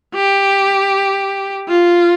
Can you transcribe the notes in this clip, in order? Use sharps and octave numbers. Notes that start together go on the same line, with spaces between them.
G4
F4